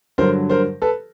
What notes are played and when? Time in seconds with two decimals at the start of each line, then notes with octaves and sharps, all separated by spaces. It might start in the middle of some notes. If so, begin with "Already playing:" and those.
0.18 G2 D3 F#3 A#4 C5
0.50 A#4 C5
0.82 A4 B4